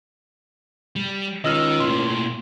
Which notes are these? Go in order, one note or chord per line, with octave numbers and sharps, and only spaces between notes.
G3
C#2 D#3 D#5 E6 F6
A2 A#3 C6